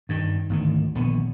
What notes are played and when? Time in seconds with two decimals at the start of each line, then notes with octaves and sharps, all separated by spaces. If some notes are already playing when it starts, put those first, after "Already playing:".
0.09 G2 D#3
0.50 G#1 D2 D#3
0.95 D#1 A#1 D3 B3